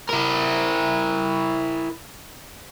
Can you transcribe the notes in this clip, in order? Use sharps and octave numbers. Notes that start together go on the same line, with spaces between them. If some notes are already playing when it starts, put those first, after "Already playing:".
E4 A#4